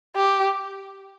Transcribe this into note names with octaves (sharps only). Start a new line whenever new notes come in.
G4